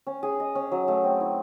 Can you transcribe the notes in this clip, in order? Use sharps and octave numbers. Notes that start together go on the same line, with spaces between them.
C#4
G#4
D#5
C#4
F#3
A3
C4
E4